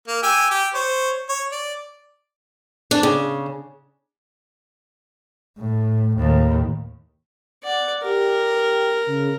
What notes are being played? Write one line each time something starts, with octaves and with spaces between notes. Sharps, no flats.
A#3
G4 G#5 E6
G4
C5 C#5
C#5
D5
D4
C#3
A2
D#2 A2
D5 F#5
G4 A#4
C#3